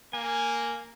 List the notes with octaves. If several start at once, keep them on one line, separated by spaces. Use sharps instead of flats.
A#3 G#5